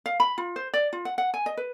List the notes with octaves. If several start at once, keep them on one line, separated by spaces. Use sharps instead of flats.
F5
B5
F4
C5
D5
F4
F#5
F#5
G#5
D#5
B4